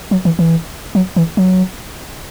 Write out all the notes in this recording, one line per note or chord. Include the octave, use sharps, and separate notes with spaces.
F#3
E3
E3
F#3
E3
F#3